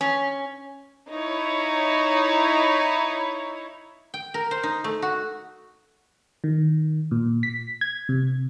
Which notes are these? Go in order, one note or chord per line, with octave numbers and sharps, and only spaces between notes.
C#4
D#4 E4 C#5
G5
A#4
C5
D#4
A3
F#4
D#3
A#2
B6
G#6
C3